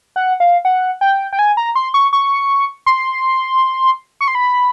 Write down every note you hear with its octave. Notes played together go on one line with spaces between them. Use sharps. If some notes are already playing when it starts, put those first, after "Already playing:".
F#5
F5
F#5
G5
G5
G#5
A#5
C6
C#6
C#6
C6
C#6
C6
B5